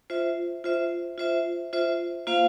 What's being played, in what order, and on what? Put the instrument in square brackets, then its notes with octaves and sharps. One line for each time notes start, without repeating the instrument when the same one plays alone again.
[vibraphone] F4 C5 E5
F4 C5 E5
F4 C5 E5
F4 C5 E5
A#3 F4 C5 F5